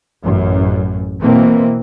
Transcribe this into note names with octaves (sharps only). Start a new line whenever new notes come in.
A1 F#2
B2 E3 A#3 C4